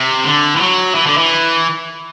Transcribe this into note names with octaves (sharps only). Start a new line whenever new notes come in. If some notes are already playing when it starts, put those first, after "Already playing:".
Already playing: C3
D3
E3
F#3
E3
D3
E3